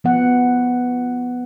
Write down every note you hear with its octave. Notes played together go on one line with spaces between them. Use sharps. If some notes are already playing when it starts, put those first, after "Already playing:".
F3 B3 F#5